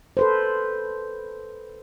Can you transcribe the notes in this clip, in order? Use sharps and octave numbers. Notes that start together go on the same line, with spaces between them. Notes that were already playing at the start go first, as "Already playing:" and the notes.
A4 B4 C5